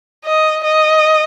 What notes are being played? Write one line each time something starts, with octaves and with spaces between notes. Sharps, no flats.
D#5
D#5